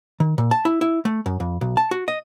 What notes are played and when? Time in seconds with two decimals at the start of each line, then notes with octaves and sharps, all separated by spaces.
0.20 D#3
0.38 A#2
0.51 A5
0.65 E4
0.81 E4
1.05 A3
1.26 F#2
1.40 F2
1.61 B1
1.77 A5
1.91 F#4
2.08 D#5